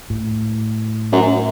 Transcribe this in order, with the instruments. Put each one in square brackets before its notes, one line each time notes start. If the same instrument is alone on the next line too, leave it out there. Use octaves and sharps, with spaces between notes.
[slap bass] A2
[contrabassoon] F#2